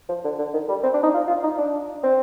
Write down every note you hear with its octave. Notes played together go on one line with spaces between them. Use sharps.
F3
D3
D3
D#3
G3
C4
D4
D#4
F4
F4
D#4
D4
C4